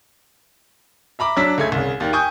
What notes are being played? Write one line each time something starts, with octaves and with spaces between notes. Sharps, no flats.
E5 A#5 B5 D6
F#3 D4 E6 B6
C#2 A3 G#6
C2 C#3
D#2 G4 D5
G5 G#5 C#6 D#6 G6